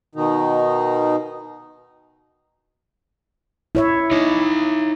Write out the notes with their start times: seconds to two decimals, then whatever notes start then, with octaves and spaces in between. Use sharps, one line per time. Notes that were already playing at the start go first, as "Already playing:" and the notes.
0.15 B2 D#3 D#4
3.75 E4 C#5 E5
4.11 D#4 E4 C#5